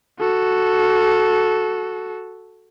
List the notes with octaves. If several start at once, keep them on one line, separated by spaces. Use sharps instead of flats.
F#4 A4